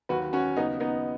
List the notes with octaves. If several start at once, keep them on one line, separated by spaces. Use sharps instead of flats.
D#2 D#3 F#3 F#4 B4
C#4 F#4
D#2 C#3 F#3 B3 D#4
B3 D#4